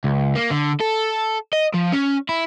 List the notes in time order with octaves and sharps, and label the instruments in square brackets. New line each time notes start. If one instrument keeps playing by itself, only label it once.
[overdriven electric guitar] C#2
A#3
D3
A4
D#5
F3
C#4
E4